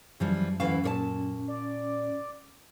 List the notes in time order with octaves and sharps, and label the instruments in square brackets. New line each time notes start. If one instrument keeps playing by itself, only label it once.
[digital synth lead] F#2 [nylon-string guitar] E3 F3 G3
[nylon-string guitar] D2 E3 F5 [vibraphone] C#4
[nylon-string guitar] A#2 C#5 A5
[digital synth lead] D5